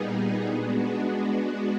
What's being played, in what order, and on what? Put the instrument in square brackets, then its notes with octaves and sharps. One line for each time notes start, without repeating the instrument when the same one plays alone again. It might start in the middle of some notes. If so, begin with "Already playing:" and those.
Already playing: [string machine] A#2 G3 B3 D#4 G#4
G#3 B3 D4 F#4